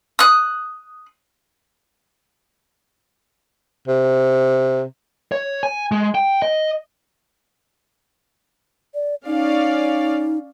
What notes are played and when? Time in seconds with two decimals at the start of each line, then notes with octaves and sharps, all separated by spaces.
0.19 D#6 F#6
3.88 C3
5.32 C#5
5.63 G#5
5.92 G#3
6.15 G5
6.42 D#5
8.94 D5
9.26 C#4 D#4 D5 F5